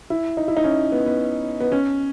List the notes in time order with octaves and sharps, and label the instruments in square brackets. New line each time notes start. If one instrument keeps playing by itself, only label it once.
[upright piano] E4
D#4
E4
D#4
C#4
B3
B3
B3
C#4